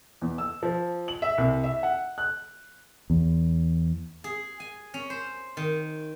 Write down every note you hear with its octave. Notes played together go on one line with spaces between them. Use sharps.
E2
E6
F3
F#7
E5
C2
E5
F#5
F#6
E2
G#4
G#5
C#4
C5
D#3